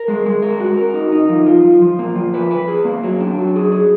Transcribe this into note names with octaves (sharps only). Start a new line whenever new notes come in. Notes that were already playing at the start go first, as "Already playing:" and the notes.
Already playing: A#4
G#3
G#3
A#4
F#4
A#4
D#4
D#4
F3
F4
F3
F3
A#3
F3
B4
B4
G#4
A#3
F#3
D4
F#3
G#4
G#4